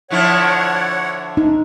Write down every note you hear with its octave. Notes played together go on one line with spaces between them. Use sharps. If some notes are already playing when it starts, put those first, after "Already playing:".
D3 F3 E4 C#5 F#5
D#4